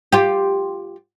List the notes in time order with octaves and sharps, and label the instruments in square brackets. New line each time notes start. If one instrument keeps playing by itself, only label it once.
[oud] F4 G4